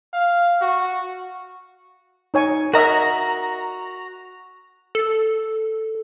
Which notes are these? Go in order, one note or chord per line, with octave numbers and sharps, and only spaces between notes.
F5
F#4
D#4 C#5 G#5
F#4 A#4 D#5 E5 A#5
A4